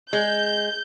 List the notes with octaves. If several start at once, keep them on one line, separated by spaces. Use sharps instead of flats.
G#3 G6